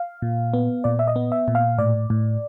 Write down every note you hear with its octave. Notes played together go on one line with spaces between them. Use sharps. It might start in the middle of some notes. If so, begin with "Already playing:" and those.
Already playing: F5
A#2
B3
A#2 D5
E5
D#5
B3
E5
A#2
F5
A2 D5
A2